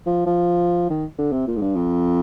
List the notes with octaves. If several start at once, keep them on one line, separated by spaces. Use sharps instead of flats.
F3
F3
D#3
D3
C3
A#2
G#2
G2
F2